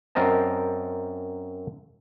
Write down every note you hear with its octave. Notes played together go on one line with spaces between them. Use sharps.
F#2 C4 A#4 C5 D#5 A5